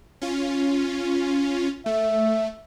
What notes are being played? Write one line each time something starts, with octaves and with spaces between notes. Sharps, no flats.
C#4 F4
A3 E5